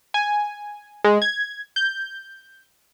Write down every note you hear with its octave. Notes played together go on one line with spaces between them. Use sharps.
G#5
G#3
G#6
G6